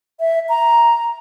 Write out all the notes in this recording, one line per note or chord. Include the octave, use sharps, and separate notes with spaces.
E5
A#5